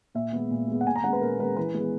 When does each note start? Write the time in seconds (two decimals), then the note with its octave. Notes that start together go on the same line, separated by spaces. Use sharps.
0.15 A#2 E5
0.33 G#3 B3
0.51 A#2
0.68 G#3 B3
0.81 F#5
0.86 A#2 G#5
0.96 A#5
1.04 G#3 C#4 F#5
1.13 B4
1.21 A#2 A#4
1.39 G#3 C#4 B4
1.56 E3 B4
1.75 G#3 B3